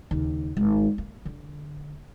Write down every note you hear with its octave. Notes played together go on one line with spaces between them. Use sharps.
D#2 C#3
G#1
A#3
D3